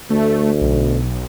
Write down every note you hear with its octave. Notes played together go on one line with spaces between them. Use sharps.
D2 A3
B1